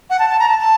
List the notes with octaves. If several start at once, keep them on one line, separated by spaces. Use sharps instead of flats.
F#5
A5
A5
A#5
A5
A5